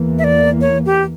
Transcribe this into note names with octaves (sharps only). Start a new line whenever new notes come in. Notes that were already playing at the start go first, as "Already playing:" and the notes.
Already playing: E2 E3 A#3
E5
D5
C#5
G4